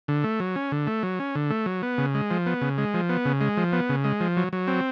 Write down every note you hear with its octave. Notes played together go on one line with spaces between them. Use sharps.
D3
A3
F#3
C#4
D3
A3
F#3
C#4
D3
A3
F#3
B3
C#3
G#3
F3
B3
C#3
G#3
F3
B3
C#3
G#3
F3
B3
C#3
G#3
F3
F#3
F#3
C4